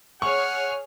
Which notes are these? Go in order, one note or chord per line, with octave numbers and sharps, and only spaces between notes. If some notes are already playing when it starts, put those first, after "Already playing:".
G#4 C#5 F#5 C#6 F6